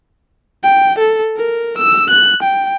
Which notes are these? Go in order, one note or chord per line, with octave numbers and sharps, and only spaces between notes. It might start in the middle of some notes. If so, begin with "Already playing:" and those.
G5
A4
A#4
E6
F#6
G5